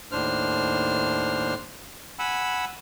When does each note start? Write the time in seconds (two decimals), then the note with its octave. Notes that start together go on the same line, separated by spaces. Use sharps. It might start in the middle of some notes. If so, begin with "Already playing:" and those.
0.12 D#2 A2 D4 C5 F6
2.19 F#5 G#5 B5 E6